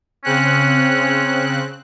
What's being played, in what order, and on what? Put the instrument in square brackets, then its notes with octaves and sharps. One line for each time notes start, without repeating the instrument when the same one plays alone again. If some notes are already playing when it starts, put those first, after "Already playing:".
[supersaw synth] C#3 C4 F#6 [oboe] C#4